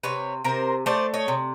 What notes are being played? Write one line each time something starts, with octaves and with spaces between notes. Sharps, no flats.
C3 B4 C#5
C3 A#4 C5
A3 C5 D5
C#5 D#5
C3